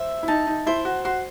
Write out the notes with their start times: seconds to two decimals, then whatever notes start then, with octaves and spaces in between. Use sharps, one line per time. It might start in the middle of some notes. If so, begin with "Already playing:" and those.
Already playing: C5 E5
0.23 E4
0.28 D#4 A5
0.47 D#4
0.66 E4 C5
0.85 F#4
1.05 F#4 C6